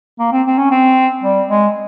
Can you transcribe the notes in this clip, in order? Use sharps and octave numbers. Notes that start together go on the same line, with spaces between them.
A#3
C4
C4
C#4
C4
G3
G#3